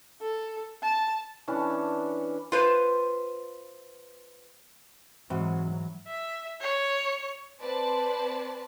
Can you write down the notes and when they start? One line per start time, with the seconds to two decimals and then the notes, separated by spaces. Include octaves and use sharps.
0.22 A4
0.83 A5
1.48 E3 C#4 D4 A5
2.52 F4 B4 C5
5.30 G#2 E3 F#3 C4 F#4
6.07 E5
6.61 C#5
7.60 C4 B4 C5 D5 A5